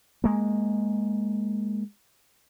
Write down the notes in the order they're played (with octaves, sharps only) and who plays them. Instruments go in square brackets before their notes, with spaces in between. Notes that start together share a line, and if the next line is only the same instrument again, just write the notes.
[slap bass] G#3 A#3